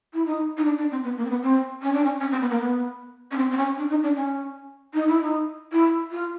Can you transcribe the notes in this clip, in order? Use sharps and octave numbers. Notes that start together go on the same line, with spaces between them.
E4
D#4
D#4
D4
D4
C4
B3
A#3
C4
B3
C4
C#4
D4
C#4
C#4
C4
B3
A#3
B3
C#4
C4
C4
C#4
D4
D#4
D4
C#4
D#4
E4
D#4
E4
F4